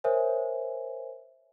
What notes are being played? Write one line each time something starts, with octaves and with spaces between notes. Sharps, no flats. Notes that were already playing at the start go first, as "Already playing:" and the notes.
A#4 C5 C#5 E5 G#5